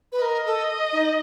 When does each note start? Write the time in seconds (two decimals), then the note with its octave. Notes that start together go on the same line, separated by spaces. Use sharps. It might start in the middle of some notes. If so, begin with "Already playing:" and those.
0.12 B4
0.22 A#4 D#5
0.46 A4
0.92 D#4